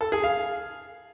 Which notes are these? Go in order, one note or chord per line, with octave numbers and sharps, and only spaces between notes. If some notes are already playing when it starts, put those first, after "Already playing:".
A4
G#4
F5